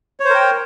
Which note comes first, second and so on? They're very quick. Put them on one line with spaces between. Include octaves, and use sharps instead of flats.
C#5 C5 A#4 G5